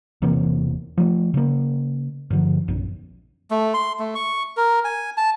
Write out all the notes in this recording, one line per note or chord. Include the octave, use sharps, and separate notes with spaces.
E1 C3 E3 A#3
F3 A3
C#3 A#3
G2 D3 F3
A#1 F#2
A3
C6
A3
C#6
A#4
G#5
A5